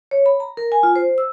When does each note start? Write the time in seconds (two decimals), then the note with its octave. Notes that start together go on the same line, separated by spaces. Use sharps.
0.11 C#5
0.26 B5
0.40 A#5
0.57 A#4
0.72 G#5
0.83 F4
0.96 C5
1.18 E6